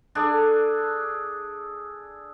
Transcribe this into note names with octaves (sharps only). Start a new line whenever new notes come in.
D4 G#4 A4 D5